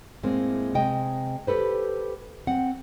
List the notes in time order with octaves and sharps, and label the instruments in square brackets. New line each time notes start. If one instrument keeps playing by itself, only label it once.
[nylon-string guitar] A2 G#3 A#3 C4
C3 G#3 D#5 G5
G4 A4 B4 C5
C4 F#5